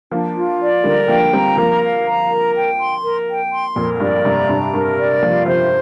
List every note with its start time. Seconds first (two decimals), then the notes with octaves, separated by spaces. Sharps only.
0.11 F3 A#3 D4
0.35 F4
0.60 D5
0.84 D3 G3 A#4
1.08 F3 A#3 G5
1.33 G3 C4 A#5
1.57 F3 A#3 A#4
1.81 F5
2.05 A#5
2.31 A#4
2.55 G5
2.78 C6
3.03 A#4
3.28 G5
3.51 C6
3.76 F2 A#2 A#4
4.00 G2 D5
4.24 G2 C3 A#5
4.49 G2 C3 D4
4.73 G2 A#4
4.98 D5
5.22 F3 A#3 F4
5.46 C3 F3 C5